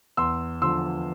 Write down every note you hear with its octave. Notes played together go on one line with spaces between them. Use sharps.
E2 C6 E6
D3 F3 C6 E6